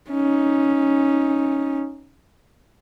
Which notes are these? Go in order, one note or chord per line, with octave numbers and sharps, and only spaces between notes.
C#4 D#4